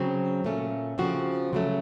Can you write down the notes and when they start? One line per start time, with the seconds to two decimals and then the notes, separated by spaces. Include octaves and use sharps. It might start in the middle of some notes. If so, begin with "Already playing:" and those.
Already playing: C#3 F#3 C4
0.44 A#2 A3 C#4
0.98 C#3 F3 C4 F#4
1.53 C#3 F#3 A3